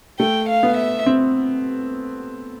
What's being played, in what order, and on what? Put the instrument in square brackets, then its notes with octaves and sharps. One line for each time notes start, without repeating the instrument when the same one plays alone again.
[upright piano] A3 [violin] G5
[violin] F5
[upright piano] B3
[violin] E5
[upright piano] C4